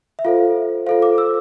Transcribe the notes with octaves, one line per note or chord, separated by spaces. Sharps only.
E5
F4 A4 C5 F5
F4 A4 C5 F5
D6
E6